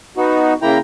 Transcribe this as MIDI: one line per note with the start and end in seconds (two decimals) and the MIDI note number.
0.17 0.54 59
0.17 0.54 63
0.17 0.54 66
0.62 0.78 49
0.62 0.78 58
0.62 0.78 64
0.62 0.78 79
0.62 0.78 82